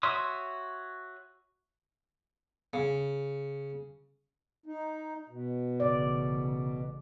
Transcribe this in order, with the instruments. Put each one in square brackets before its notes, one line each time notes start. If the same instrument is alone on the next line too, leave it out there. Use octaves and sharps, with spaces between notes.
[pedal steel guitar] F#4 C#5 E5 C6 D#6
[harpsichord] C#3
[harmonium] D#4
B2
[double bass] A1 C#3 [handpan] D5